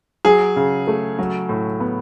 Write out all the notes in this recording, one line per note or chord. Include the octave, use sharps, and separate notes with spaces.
F#3 G#4
C#3
A3
F#3
A2
B3